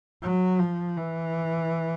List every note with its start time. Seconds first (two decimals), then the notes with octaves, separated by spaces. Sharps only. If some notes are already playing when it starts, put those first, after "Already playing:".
0.22 F#3
0.59 F3
0.97 E3